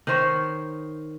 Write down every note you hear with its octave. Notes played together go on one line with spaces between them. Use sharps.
D#3 D#4 C5 C#5